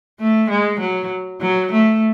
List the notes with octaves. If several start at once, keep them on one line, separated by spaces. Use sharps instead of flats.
A3
G#3
F#3
F#3
A3